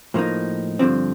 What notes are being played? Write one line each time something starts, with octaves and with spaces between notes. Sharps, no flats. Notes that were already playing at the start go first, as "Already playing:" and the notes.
A2 F3 A#3 D#4
G2 D3 F3 C4